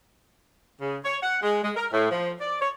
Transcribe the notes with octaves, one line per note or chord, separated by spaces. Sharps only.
C#3
C#5
F#5
G#3
G#3
A#4
A2
F3
D5
C#5